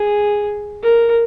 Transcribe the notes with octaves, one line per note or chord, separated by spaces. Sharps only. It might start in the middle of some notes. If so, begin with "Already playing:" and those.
Already playing: G#4
A#4